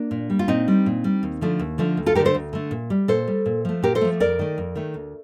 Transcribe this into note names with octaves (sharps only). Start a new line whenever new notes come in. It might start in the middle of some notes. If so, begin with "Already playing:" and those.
Already playing: A#3 D4
A#2
G3
F4
A#2 C4 D#4
G3
A#2
G3
D#2
D3 F3 A3
D#2
D3 F3 A3
D2
F4 A4
D3 A3 G4 A#4
A4 C5
D2
D3 A3
A#2
G3
A#2 A4 C5
G3
A#2
F3 A3
A#2 G4 A#4
A4 C5
F3 A3
F2 A#4 D5
D#3 A3
F2
D#3 A3
D2